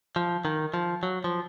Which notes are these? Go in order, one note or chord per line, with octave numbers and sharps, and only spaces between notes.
F3
D#3
F3
F#3
F3